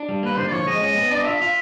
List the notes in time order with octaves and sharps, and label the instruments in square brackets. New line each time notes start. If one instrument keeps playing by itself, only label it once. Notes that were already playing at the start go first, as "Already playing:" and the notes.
Already playing: [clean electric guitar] D4
G3
[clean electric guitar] A#3 [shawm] B4
[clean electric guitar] D3 [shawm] C5
[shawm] D5
[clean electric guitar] F3 [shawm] C#5
[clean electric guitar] G#3 [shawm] D#5
[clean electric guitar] C#4
B3
[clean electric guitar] D4 [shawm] D5
[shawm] D#5
[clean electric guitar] F4 [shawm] E5
[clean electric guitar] F4